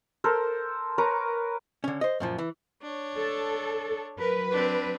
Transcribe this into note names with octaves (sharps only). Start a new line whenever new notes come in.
A4 A#4 C5
A#4 B4 C#5 A#5
D3 C#4
C5 D#5
F#2 A#2 F3
E3
D4 C#5
A4
F#3 A#4 B4
C4 D4